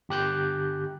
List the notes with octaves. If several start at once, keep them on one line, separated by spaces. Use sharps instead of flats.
G1 G4 F#6 G6